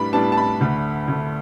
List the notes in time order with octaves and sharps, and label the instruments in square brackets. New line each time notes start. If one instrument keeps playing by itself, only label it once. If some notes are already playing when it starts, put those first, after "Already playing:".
Already playing: [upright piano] A2 G3 B3 D4 B5
A2 G3 B3 D4 A5
A5
B5
D2 D3 A3
D2 D3 A3